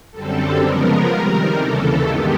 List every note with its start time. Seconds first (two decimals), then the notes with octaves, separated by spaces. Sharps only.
0.11 F#2 D3 G3 C4 A4
0.59 C#3 F3 G#3 B3 A#4
1.07 C3 D#3 G3
1.55 D#2 C#3 E3 A4
2.03 G2 D#3 G#3 B3 G4